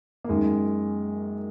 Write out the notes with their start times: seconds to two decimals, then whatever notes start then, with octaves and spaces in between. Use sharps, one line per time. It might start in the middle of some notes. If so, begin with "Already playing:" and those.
0.24 A#3
0.29 F#2 D#3 G#3